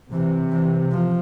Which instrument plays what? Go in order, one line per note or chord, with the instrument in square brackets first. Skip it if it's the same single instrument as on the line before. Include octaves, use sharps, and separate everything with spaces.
[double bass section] C3 [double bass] E3
[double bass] E3
F3